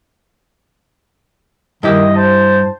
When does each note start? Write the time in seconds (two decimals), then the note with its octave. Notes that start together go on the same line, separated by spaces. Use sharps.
1.83 G2 D#3 E4 G4 D#5
2.16 C5 A5